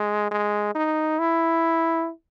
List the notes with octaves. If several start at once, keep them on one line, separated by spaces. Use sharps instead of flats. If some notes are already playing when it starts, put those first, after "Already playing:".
Already playing: G#3
G#3
D#4
E4